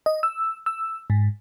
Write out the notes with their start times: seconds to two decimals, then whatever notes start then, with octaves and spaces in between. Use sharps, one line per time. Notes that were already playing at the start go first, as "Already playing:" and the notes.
0.06 D#5
0.23 E6
0.66 E6
1.10 G#2